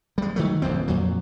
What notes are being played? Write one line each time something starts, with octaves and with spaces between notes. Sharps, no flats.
G3 G#3
D#3 F#3 A3
D1 A#1 F2 C4
F2 A#2 F#3